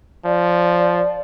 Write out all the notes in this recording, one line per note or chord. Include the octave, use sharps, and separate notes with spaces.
F3 D5